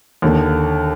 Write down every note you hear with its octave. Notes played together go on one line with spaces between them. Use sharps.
D#2 D3